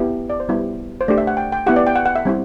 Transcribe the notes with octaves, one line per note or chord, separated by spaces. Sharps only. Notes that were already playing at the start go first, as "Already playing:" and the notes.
Already playing: B3 E4 G4
D5
C5
G3 B3 E4 G4
C5
A3 D4 G4 D5
E5
F#5
G5
G5
B3 E4 G4 F#5
D5
G5
F#5
F#5
E5
G3 C4 E4 G4